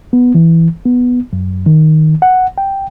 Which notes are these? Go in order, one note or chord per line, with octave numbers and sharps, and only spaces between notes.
B3
E3
B3
F#2
D#3
F#5
G5